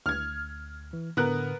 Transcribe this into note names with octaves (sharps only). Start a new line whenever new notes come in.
D2 F6 G#6
E3
A2 D3 B3 A#4 F#6